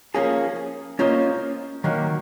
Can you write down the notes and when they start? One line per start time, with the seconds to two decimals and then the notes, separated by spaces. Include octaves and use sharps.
0.14 F3 A#3 C#4 G#4
0.99 A#3 C#4 F4 C5 D#5
1.84 D#3 F#3 A#3